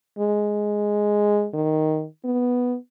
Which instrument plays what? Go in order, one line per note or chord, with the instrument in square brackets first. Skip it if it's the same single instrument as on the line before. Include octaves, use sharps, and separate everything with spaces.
[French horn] G#3
D#3
B3